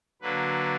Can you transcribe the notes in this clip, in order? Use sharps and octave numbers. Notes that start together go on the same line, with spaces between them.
D3 F#3 A#3 D4 B4